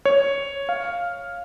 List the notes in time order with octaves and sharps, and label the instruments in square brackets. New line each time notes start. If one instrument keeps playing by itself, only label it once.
[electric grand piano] C#5
F5